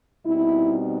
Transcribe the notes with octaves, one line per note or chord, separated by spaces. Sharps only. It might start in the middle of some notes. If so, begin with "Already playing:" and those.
B2 G3 C4 D#4 E4